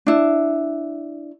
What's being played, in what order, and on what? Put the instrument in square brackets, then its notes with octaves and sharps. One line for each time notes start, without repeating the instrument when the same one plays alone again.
[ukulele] D4 E4